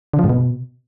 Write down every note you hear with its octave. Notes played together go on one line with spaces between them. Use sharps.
D3
F3
G#2
B2